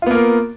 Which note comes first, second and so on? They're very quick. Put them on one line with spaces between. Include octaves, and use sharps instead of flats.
F4 B3 A#3 A#4